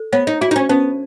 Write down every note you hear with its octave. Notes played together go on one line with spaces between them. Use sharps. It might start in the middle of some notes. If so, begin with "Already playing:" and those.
Already playing: A4
B3 C#5
D#4
E4 F#4
D#4
C#4
B3 C#4